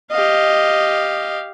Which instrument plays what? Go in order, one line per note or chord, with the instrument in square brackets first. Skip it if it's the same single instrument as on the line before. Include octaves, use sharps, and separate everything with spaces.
[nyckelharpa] G4 F5 [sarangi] D#5